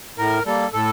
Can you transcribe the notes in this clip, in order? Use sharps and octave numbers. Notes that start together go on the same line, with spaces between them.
A2 A#4
G3 A#3 A4
A2 A4